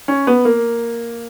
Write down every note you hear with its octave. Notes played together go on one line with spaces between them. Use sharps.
C#4
B3
A#3